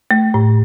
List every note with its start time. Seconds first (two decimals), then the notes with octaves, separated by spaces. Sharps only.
0.11 A3
0.34 A2